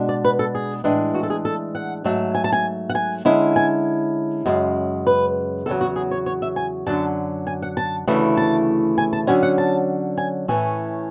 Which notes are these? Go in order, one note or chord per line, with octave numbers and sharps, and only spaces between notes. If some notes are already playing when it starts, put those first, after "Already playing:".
Already playing: B2 G#3 D4
D5
B4
A4
G#4
A2 E3 G#3 D4
F#4
A4
G#4
A4
F#5
G#2 F#3 A3
G#5
A5
G#5
F#5
G#5
D3 G#3 C#4 E4
G#5
F#2 C#3 G#3
B4
E2 C#3 F#3 A4
F#4
G#4
C#5
C#5
E5
G#5
F#2 D3 F#3 A5
G#5
F#5
A5
D2 C#3 E3 A3 E4
A5
G#5
A5
D3 F#3 C#4 G#5
F#5
A5
G#5
A2 E3 A3 C#4 G#5